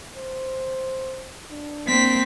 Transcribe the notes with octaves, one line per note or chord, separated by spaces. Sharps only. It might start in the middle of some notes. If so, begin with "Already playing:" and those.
C5
D4
A#3 C4 B6